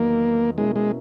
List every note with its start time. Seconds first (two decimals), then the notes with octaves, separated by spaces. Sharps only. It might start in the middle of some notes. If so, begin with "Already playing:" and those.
Already playing: E2 D#3 F#3 A#3 B3 D#4
0.58 B2 G#3 A#3 C#4 E4
0.76 G#3